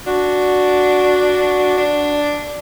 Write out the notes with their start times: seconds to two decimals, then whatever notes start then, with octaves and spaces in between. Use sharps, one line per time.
0.07 D4 F#4
1.78 D4